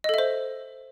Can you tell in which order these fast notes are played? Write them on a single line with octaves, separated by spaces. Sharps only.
D#5 A4 E5 C5